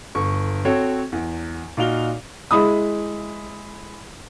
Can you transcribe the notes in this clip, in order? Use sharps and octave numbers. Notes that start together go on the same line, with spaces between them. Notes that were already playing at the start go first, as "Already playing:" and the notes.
G1 C#6
C4 F#4 A4 C#5
E2
A#2 D#4 F4 F#4 F7 G7
G#3 E4 B5 D#6